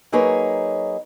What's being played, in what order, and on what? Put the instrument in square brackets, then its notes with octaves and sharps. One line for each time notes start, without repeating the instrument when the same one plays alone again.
[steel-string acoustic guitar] F#3 A#3 D#4 G#4 B4 C#5